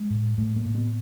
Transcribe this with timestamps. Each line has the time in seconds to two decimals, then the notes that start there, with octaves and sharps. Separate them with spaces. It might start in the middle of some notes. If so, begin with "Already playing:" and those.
Already playing: G#3
0.10 A2
0.38 A2 A3
0.56 A#3
0.65 A2
0.75 B3